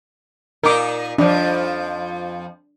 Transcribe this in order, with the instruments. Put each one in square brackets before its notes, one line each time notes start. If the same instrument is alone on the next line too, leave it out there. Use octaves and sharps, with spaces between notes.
[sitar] A#2 D#4 [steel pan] A#4 D6
[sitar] F2 F3 [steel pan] D4